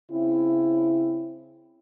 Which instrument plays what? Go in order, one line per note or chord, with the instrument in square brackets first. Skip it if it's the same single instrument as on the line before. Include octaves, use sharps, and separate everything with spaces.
[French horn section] C#3 C4 E4